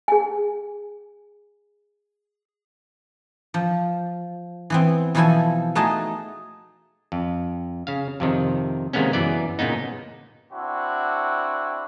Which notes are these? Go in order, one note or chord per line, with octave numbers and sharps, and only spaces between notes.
G#4 G#5
F3
E3 B3 C4
B2 E3 F3 E4 A4 G#5
A3 D#4 F#4 G#4 D#5 A5
F2
C#3 F5
F2 C3 D#3
C3 D#3 G#3 A#3 B3 C#4
F#2 E3 B3 D5
A#2 C#3 A#3 B3 D#4
C4 D4 E4 F#4